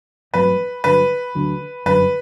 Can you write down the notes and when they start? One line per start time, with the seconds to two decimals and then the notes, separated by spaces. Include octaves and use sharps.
0.33 A1 G2 F#3 C4 B4
0.84 G2 D3 F#3 B4
1.35 D2 D3 F#3
1.86 G1 F#2 D3 F#3 B4